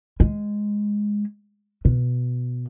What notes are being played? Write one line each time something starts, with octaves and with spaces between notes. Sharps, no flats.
G#3
B2